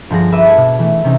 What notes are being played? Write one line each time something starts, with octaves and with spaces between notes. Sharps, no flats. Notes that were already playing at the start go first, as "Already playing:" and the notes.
G1 F3 G#4 A#6
B4 E5 D6 D#7
A5 G#6
B2
E3 A3
C3 E3 C#4 D#4